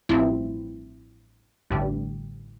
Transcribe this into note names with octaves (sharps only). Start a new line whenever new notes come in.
A1 G2 F3 C4 E4
A1 G2 D3 G3